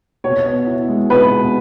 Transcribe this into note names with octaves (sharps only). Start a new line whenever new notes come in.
B2 C#5
B3
E4
G#3
B2 B4
B3